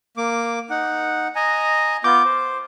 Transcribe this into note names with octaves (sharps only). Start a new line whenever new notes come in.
A#3 D6
D#4 F#5
D#5 G#5 A#5
B3 F4 D6 G6
C5